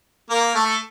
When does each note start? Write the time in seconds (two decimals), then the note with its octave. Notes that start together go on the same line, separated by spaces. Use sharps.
0.30 A#3 A#4
0.54 A3 A4